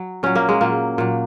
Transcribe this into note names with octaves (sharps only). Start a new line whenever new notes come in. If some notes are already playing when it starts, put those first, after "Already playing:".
Already playing: F#3
A#2 F#3 C#4
A#3
G#3
A#2 F#3 A#3
A#2 F#3